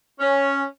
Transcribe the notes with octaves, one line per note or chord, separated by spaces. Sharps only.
C#4